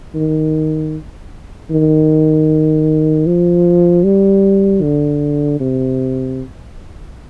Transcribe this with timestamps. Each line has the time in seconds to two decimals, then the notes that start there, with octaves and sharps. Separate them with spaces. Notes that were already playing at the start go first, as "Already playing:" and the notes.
0.15 D#3
1.70 D#3
3.26 F3
4.04 G3
4.82 D3
5.60 C3